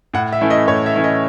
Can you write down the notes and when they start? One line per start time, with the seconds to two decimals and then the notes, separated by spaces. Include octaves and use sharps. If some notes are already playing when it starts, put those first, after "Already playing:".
0.14 A2 F#5
0.33 E5
0.41 E3 A3 C#4 E4
0.50 D#5
0.67 A2 C#5
0.86 E5
0.95 E3 A3 C#4 E4
1.04 D#5